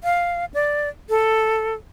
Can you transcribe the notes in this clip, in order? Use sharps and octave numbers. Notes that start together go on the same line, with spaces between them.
F5
D5
A4